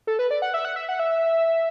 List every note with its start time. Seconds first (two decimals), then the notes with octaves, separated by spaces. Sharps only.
0.07 A4
0.19 B4
0.31 D5
0.42 F#5
0.54 E5
0.65 F#5
0.76 E5
0.89 F#5
0.99 E5